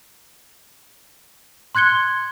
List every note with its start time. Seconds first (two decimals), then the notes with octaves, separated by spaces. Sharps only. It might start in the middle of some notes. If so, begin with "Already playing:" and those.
1.75 C6 F#6 G#6 C#7 G7